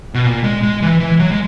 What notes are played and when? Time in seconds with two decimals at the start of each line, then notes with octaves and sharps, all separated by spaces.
0.14 B2
0.26 A#2
0.44 G#3
0.63 G#3
0.82 E3
1.00 E3
1.19 F#3
1.32 G#3